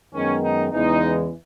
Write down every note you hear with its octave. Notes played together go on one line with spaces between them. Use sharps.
F#2 D#3 G#3 B3 C#4
D#4
E2 C#3 E3 G#3 B3 D#4